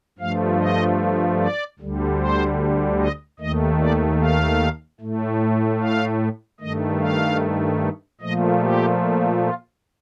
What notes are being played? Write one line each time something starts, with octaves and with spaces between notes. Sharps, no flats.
G2 F3 A3 F5
D#5
D5
D2 D3 G3
C5
D#5
D#2 D#3 A3 D#5
D5
F5
A2 A3
F5
G2 D#3 A3 D#5
F5
A#2 F3 A3 D#5
G4
F4